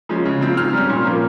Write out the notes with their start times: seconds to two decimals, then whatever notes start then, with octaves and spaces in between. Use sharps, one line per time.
0.09 F3 G#3 C#4
0.25 C#3
0.41 F3 C4
0.57 G#2 F6
0.73 G3 C#4
0.89 A#2
1.05 F3 A#3 C#4